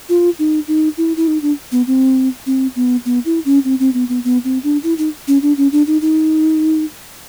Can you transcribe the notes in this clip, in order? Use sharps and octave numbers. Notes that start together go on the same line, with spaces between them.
F4
D#4
D#4
E4
E4
D#4
D4
B3
C4
C4
B3
B3
E4
C#4
C4
C4
B3
B3
B3
C4
D4
E4
D#4
C#4
D4
C#4
D4
D#4
D#4